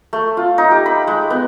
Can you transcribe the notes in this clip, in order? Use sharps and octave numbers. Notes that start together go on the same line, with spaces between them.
A3
F4
D#4
G4
B5
G#3
B3